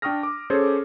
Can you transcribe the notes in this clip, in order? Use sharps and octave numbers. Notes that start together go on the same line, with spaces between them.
D4 G5 C#6 D#6 F6 A#6
D6
C#4 G#4 A4 C5 C#5